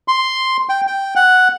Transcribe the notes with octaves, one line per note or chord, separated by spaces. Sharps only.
C6
G5
G5
F#5